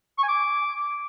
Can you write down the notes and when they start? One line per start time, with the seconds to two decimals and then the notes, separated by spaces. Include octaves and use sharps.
0.18 C#6
0.23 G#5
0.28 D6